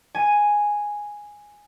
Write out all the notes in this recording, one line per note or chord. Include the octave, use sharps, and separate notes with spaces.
G#5 D#7